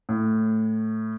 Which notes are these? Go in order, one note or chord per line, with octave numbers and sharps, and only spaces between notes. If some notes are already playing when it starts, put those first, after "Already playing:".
A2